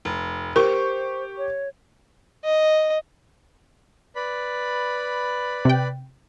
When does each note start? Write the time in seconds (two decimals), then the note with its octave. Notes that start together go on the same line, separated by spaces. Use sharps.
0.05 F1
0.56 G4 A#4 C5 C#6
1.38 C#5
2.44 D#5
4.16 B4 D5 B5
5.65 C3 G5